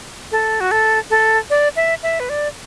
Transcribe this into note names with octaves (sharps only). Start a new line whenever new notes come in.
A4
F#4
A4
A4
D5
E5
E5
B4
D5